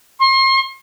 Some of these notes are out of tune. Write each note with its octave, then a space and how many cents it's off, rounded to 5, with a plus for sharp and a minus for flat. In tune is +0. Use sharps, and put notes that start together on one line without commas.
C6 +35